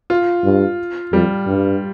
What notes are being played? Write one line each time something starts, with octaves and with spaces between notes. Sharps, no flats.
F4
G2
F2 G3
G2